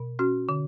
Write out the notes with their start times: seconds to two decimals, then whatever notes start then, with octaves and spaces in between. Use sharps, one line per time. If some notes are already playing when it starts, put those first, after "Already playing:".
Already playing: B2
0.19 C#4 F#4
0.49 D3